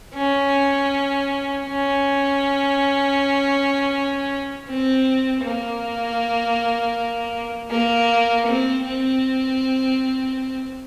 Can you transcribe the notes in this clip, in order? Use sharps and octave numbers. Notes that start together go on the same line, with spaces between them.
C#4
C#4
C4
A#3
A#3
C4
C4